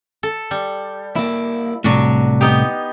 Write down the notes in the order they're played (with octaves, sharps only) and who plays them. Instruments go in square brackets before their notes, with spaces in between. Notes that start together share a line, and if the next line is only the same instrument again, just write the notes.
[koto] A4
G3
[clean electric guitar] A#3 E4
[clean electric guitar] C2 A2 [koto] F#3 D4 F#4
[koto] B3 D#4 G4